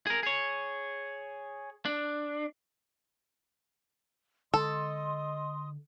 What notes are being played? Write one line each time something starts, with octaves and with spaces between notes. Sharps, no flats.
G#4 A#4
G#4 C#5
D4
D3 G#3 A4 D#5 C6 D#6